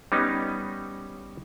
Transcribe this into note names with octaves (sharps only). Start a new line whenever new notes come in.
G3 B3 C#4 D#4